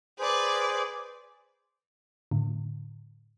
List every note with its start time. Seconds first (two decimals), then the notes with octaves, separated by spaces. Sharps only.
0.19 G#4 B4 C5 D5
2.31 A2 D3